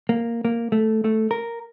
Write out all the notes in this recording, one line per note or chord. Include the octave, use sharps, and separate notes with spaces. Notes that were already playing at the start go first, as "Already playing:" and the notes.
A#3
A#3
A3
A3
A#4